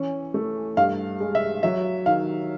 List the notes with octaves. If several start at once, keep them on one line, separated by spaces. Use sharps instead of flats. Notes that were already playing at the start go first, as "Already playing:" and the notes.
Already playing: E3 C#4
A3
G2 F5
G#3
E5
F#3 E5
D#3 F5